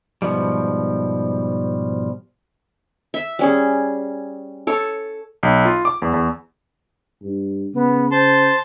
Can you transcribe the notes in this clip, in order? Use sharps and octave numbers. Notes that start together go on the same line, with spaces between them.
G#2 B2 F3 G3
E5
G3 C#4 G#4
A4 C#5
B1
F4
D6
E2
E2
G2
C#3 B3
C5 A5 C6